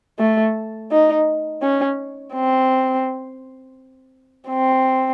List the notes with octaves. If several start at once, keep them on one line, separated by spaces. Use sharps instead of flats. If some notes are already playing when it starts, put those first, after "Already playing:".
A3
D#4
C#4
C4
C4